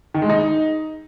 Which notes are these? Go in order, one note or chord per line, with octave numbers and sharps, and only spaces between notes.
D#3
G#3
D#4